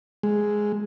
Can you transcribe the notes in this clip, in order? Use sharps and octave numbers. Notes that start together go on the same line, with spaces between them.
G#3